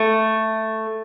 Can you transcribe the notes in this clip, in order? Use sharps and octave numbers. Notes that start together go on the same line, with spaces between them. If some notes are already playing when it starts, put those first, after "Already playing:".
Already playing: A3